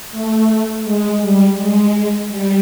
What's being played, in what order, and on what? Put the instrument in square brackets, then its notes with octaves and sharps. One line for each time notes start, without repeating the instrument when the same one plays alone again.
[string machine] A3
G#3
G3
G#3
G3